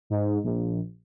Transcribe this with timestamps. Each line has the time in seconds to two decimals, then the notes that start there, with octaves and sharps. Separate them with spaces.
0.10 G#2
0.44 A#1